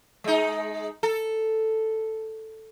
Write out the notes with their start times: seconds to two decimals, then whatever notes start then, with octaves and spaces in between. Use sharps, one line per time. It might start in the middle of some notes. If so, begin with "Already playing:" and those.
0.24 G#3 D#4
1.03 A4